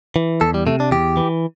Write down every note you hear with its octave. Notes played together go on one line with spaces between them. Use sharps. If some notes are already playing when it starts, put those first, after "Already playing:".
E3
E2 A4
G3
C3 A3
D4
E2 G4
E3